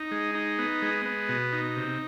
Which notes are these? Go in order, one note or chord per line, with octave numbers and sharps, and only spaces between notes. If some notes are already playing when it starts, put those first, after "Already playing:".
Already playing: D#4
G#3
D#4
B3
G#3
B3
B2
D#4
C3